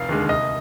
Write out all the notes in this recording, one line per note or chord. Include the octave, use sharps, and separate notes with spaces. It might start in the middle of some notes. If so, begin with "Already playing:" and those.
Already playing: F1 F5
D#2 D3 G#3
C2 D#5